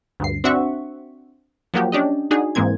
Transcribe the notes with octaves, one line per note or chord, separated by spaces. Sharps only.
D2 G2 C7
C4 D4 F#4 E5 F#5 C#6
F3 F#3 A#3 F#4 G4
C#4 D4 G4 D#5
D4 D#4 F#4 G#4
G#2 E3 G#3 A#3 C4 G#6